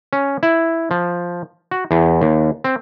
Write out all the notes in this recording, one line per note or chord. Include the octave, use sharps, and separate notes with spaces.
C#4
E4
F3
F#4
E2
D#2
C4